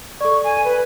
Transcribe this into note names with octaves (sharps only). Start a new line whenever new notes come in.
A4 D5 C#6
G#5
B4